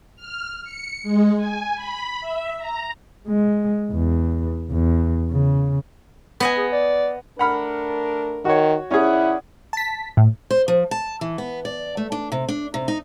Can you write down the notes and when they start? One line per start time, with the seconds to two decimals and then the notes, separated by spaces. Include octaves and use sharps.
0.16 F6
0.64 C#7
1.03 G#3
1.37 G#5
1.76 B5
2.21 E5
2.58 A#5
3.27 G#3
3.91 E2
4.70 E2
5.32 C#3
6.40 B3 D#5 G#5
6.57 G#4
6.72 D5
7.39 A3 D4 A#4 F#5 B5 F6
8.45 D#3 F#4 C#5
8.91 D#3 C#4 E4 G#4 D5 F#5
9.73 A5 B6
10.17 A2
10.50 C5
10.68 F3
10.91 A5
11.21 E3
11.38 B3
11.65 D5
11.97 A3
12.12 D4
12.32 C3
12.49 D4
12.74 C3
12.88 D#4